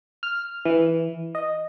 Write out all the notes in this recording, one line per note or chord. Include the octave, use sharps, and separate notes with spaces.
F6
E3
D#5